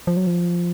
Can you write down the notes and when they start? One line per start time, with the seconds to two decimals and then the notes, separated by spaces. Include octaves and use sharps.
0.07 F3
0.17 F#3
0.27 F3